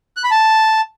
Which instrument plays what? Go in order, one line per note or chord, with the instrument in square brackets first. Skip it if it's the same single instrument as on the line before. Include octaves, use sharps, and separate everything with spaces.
[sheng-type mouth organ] F#6
B5
A5